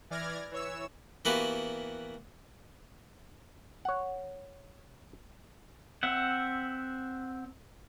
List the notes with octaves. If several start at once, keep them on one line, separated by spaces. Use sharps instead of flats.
E3 D5 F6 G#6 A#6
E3 C#5 E6
E3 A#3 B3 F#4 G4 B4
C#5 F#5
C4 E5 F#5